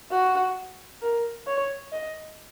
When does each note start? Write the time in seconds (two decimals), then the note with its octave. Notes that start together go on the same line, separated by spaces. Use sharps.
0.11 F#4
1.02 A#4
1.47 C#5
1.92 D#5